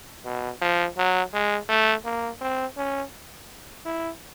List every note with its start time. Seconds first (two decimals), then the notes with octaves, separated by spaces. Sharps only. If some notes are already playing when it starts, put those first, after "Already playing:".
0.25 B2
0.62 F3
0.98 F#3
1.34 G#3
1.69 A3
2.05 A#3
2.41 C4
2.77 C#4
3.85 E4